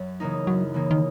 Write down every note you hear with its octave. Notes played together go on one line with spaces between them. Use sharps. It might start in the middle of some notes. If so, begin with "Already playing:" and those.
Already playing: F#2 F#3
C#3 E3 A#3 D#4
F#2 F#3
C#3 E3 A#3 D#4
D#3